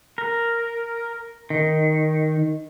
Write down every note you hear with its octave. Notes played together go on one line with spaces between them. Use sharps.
A#4
D#3